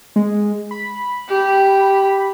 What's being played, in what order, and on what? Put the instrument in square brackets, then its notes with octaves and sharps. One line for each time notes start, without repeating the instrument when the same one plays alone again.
[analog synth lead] G#3
B5
[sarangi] G4